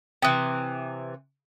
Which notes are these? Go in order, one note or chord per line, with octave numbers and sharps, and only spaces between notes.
C3 E3 G5 D#6 F#6